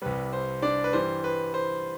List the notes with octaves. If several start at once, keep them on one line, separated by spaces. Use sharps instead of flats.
C2 C3 G3 B4
C5
D4 D5
B4
G2 E3 G3 C5
B4
C5